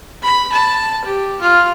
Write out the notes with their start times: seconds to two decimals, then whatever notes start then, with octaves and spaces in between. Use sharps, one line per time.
0.22 B5
0.52 A5
1.05 G4
1.42 F4